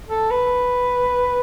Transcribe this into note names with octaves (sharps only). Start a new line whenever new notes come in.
A4
B4